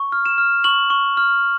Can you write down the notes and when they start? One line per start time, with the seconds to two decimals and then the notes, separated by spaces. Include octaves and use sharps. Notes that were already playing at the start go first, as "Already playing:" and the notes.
Already playing: C#6
0.12 F6
0.26 E7
0.38 F6
0.64 C#6 F#7
0.90 C#6
1.17 F6